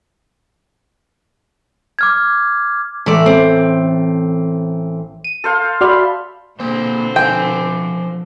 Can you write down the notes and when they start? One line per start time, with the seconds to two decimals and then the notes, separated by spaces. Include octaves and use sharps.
1.99 D6 F6 G#6
3.06 A1 A3 D5
3.26 C4
5.24 D#7
5.44 A4 C5 F5
5.81 F#4 D5 E5 B5 C6 F6
6.60 B2 D3 A#3 C4 C5
7.16 F3 G5 G#5